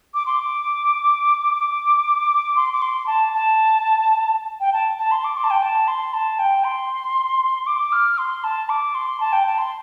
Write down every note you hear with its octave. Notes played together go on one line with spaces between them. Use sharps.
D6
C6
D6
D6
C6
D6
C6
A5
A5
G5
A5
A5
C6
D6
C6
A5
G5
A5
C6
A5
G5
C6
D6
F6
C6
A5
D6
C6
A5
G5
A5
C6